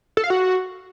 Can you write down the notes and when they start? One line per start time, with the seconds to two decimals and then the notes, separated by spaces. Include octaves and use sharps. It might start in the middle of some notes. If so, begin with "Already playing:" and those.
0.17 A4
0.24 F5
0.30 F#4